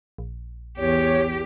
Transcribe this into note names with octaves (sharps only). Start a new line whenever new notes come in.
A#1
E2 G4 C#5